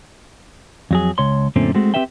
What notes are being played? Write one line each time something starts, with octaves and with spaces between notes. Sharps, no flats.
F2 F#3 G#4
C#2 C#5 C6
F#2 A#2 D3 A3 C4 C#4
G#3 A3 C4 F#4
C4 C#4 G4 B4 E5 G5